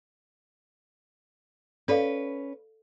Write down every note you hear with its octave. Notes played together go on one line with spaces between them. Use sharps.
C#4 A4 B4 D5 F5